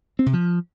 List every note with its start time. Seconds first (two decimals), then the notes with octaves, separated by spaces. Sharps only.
0.19 C4
0.26 C3
0.33 F3